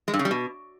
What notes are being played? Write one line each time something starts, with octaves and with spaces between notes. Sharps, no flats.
G#3
G2
C#3
G3
B2